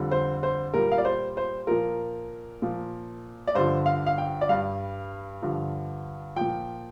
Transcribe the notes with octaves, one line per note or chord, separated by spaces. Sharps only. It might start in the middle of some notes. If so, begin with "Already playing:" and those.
Already playing: F2 D3 G3
C5
C5
A#2 G3 A#4
F5
D5
C5
C5
A#2 F3 A#4
A#2 F3
D5
G2 D3 F3 C5
F5
F5
G5
D5
G2 G3 F5
G2 D3 F3
A#2 F3 G5